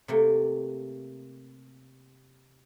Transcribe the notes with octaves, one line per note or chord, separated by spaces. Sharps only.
C3 A3 A#3